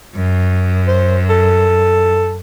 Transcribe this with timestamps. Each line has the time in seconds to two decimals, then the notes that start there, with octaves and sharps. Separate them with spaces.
0.15 F#2
0.87 C5
1.30 A4